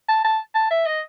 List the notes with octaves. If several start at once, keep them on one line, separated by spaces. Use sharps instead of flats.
A5
A5
A5
E5
D#5